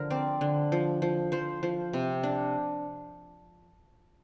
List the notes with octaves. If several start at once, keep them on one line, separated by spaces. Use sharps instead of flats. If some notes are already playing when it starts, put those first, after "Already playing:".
Already playing: D3 F3 A#4
C4 D5
D3
F3
F3
F3 C5
F3
C3
D4